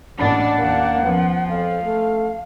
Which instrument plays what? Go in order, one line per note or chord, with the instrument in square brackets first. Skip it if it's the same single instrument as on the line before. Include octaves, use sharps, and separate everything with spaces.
[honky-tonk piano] A1 A#2 B5 [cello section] D4 [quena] F#5
[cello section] D#2 D4 [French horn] A#3
[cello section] F3 [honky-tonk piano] B3 C#4
[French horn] F2 [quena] F5
[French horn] A3